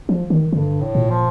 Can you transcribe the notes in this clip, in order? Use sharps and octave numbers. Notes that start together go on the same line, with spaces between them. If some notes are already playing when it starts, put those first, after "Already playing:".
F3
D#3
G2 D3
A2
A#2
F3